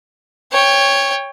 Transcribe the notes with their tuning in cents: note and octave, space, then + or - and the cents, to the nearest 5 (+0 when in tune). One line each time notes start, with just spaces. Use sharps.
C#5 +5 G5 +25